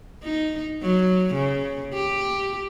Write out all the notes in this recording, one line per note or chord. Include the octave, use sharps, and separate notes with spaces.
D#4
F#3
C#3
G4